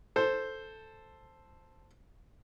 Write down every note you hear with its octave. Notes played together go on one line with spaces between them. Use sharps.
A4 C5